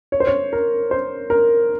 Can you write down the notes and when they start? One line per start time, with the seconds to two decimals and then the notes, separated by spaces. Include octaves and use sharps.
0.12 C#5
0.20 C5
0.27 C#5
0.53 A#4
0.91 C5
1.30 A#4